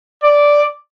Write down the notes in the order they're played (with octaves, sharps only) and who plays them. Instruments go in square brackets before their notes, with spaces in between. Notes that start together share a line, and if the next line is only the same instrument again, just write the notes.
[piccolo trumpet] D5